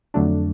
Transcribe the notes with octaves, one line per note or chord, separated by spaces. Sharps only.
F2 D3 F#3 A3 D4